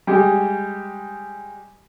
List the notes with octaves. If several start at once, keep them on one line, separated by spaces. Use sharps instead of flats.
G3 G#3 G4